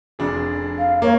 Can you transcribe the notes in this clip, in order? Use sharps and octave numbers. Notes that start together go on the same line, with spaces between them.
F1 D4 G#4
F5
A#3 C#5